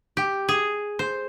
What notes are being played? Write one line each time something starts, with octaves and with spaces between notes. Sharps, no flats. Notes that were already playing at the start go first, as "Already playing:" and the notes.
G4
G#4
C5